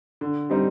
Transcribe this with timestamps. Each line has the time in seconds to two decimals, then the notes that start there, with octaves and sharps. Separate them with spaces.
0.21 D3
0.50 G3 C4 D#4